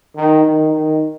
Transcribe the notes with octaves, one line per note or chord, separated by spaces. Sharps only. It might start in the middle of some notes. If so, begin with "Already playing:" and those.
D#3
D#3
D#3